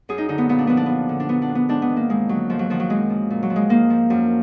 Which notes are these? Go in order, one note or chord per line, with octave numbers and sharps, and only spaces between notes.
F#2 G#4
D#4
D3 D#4
B3
A#2 B3
D4
F3 B3
D4
F#2 B3
D3
D4
A#2 B3
D4
F3
B3
G#2 D4
B3
D#3
A#3
F2 G#3
D3 F#3
G#2 F3
F#3
D#3 F3
F#3
F#2 G#3
F3
A#2
F#3
F3
G#3
G#2 A#3
F3
F#2